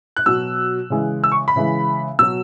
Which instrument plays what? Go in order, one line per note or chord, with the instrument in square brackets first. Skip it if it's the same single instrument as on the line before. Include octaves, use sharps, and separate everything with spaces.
[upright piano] F#6
B2 F#3 E6
C#3 E3 G#3
E6
C#6
B5
C#3 E3 G#3
B2 F#3 E6